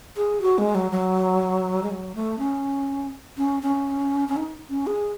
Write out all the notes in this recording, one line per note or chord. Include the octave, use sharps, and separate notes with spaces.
G#4
F#4
G#3
F#3
F#3
G#3
F#3
A3
C#4
C#4
C#4
C#4
D#4
C#4
G#4